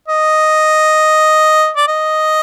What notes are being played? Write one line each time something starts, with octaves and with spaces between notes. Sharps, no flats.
D#5
D5
D#5